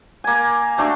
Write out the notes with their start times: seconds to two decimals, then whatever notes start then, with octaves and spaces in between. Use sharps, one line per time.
0.24 A#3 G#5
0.78 A3 D4 F#4